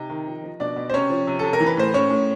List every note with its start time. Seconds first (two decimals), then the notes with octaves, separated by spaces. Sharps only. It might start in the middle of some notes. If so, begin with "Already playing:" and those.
Already playing: C3 D#4
0.10 D#3
0.27 F3
0.44 F3
0.60 B2 D4 D5
0.76 B2
0.90 C5
0.94 C3 C#4 C#5
1.10 F3
1.27 C3
1.39 C3 A4
1.53 A#4
1.60 E3
1.66 B4
1.77 A2 C5
1.94 A2 C#4 C#5
2.10 A2